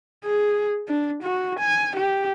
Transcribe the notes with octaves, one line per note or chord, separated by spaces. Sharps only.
G#4
D4
F#4
G#5
G4